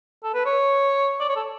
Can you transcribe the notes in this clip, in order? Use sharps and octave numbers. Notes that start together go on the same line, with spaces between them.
A4
B4
C#5
D5
C#5
A4